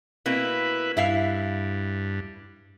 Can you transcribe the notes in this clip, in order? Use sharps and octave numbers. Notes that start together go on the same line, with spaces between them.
B2 A#3 C4 E4 B4
G2 E4 E5 F5